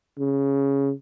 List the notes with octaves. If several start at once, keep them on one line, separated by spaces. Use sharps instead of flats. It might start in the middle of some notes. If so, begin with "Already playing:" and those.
C#3